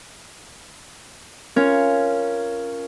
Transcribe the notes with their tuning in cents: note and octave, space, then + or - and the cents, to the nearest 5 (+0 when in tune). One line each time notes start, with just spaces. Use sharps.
C#4 +0 F4 -15 A#4 +0